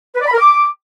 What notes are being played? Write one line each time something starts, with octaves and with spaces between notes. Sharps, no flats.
B4
D5
B5
A#4
D6